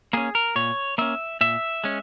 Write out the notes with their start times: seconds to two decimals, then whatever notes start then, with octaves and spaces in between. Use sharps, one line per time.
0.13 A#3 C#4 G#4
0.35 A#4
0.56 A#2 C#5
0.98 A#3 C#4 E5
1.41 A#2 E5
1.84 G#3 C#4